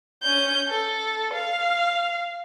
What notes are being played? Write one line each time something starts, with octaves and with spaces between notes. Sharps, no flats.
C#4 G6
A4
F5